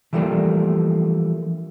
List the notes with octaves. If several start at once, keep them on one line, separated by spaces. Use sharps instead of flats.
E3 F3 G3 A3 A#3 D4